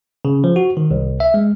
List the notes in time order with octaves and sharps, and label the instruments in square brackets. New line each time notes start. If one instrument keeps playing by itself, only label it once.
[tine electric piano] C#3
F3
F#4
D#3
C2
E5
G#3